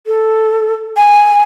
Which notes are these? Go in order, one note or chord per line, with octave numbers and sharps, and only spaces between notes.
A4
G#5